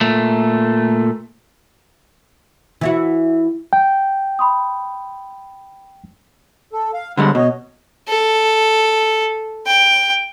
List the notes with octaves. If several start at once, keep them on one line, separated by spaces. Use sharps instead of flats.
A#2 A3
E3 E4 F#4
G5
B5 C6 D#6
A4
F5
D3 G3 G#3 F#5
B2 F#4 C#5 D#5
A4
G5